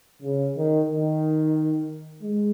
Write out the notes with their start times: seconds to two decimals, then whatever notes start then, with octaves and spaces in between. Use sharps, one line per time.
0.23 C#3
0.57 D#3
0.90 D#3
2.23 G#3